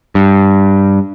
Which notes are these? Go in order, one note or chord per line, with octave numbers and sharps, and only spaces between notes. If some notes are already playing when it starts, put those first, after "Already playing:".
G2